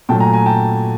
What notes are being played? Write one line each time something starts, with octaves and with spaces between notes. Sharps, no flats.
A#2 F#3 A3 G5 A5
G#5 A#5
G#5 A#5
G5 A5